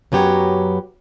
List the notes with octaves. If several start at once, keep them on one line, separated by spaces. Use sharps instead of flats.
F#2 F#3 B3 G4 C#5 A#5